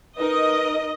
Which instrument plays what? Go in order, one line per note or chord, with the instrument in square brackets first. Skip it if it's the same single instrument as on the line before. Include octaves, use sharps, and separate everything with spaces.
[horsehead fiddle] D#4 A#4 [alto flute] B4 [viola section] D#5